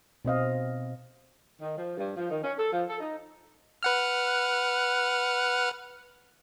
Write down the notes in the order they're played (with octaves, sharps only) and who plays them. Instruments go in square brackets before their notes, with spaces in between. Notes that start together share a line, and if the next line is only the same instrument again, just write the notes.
[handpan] B2 C4 D#5 F5
[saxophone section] D#3
F3
G2
F3
D#3
C#4
A4
F3
A4
D#4
[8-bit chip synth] B4 F#5 F6